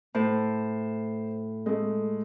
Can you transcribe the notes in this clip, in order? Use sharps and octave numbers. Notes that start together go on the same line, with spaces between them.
A2 C5
G#3 A3